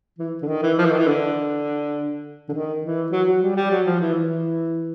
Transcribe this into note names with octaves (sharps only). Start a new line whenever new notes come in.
E3
D3
D#3
E3
F3
E3
D#3
E3
D3
D3
D#3
E3
F#3
F#3
G3
G3
F#3
F3
E3
E3